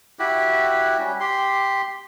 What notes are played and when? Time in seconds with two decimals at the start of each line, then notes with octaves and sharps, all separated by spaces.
0.19 E4 F#4 G4
0.99 G3 C#4
1.20 G4 C6